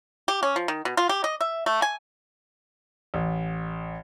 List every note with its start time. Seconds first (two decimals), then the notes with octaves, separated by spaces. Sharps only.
0.28 G4
0.43 C#4
0.56 F3
0.68 D#3
0.85 B2
0.97 F4
1.09 G4
1.24 D#5
1.41 E5
1.66 A3
1.82 G#5
3.14 A1